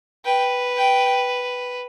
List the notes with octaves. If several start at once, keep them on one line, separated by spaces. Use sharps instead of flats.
B4 G5
G5